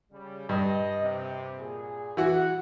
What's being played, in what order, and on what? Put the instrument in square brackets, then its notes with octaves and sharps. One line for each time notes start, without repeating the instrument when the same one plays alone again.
[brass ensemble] C#3 G3
[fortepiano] G2 [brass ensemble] D#5
[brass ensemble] C3
A#2 G#4
[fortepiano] E3 F#4 [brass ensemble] F#5